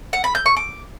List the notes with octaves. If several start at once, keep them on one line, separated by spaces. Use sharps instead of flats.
F#5
B5
G6
C#6
D6